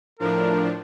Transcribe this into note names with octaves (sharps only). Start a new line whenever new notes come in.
A2 F3 D4 A#4